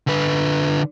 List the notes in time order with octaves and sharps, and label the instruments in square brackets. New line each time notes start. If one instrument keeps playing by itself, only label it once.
[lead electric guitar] D3 B4